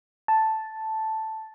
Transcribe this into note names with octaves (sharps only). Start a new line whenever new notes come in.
A5